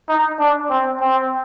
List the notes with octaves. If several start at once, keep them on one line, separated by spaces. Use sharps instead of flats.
D#4
D4
C4
C4